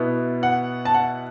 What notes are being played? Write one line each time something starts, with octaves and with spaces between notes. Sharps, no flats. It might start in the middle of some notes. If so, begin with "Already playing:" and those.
Already playing: B2 B3 E4
F#5
A5
F#5